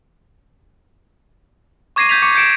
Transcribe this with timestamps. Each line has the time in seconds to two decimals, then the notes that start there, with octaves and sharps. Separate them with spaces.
1.96 C#6 D6 G#6 A#6 C7 D#7
2.09 G6 G#6 B6 F7
2.22 C#6 D6 C#7
2.36 G6 C#7 D7 E7